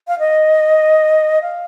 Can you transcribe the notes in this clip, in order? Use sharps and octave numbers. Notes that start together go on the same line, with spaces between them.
F5
D#5
F5